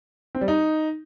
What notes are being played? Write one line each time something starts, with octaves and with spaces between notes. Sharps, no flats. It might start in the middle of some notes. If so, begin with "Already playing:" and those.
C4
G3
D#4